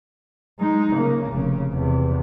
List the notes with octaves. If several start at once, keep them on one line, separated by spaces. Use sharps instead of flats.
G#3 D#4
C#3 A#3
F1 C#3
E2 C3